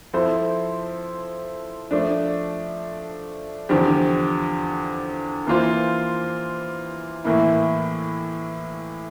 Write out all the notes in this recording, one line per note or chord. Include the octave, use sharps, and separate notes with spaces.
F3 C4 E4 A4 C5
F3 A3 D4
E2 D3 F3 C4 G4
E3 A#3 F4 C5
A2 E3 A#3 E4